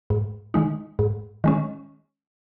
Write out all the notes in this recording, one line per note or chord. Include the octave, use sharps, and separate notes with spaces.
G#2
D#3 G#3 D#4
G#2
D#3 G#3 C#4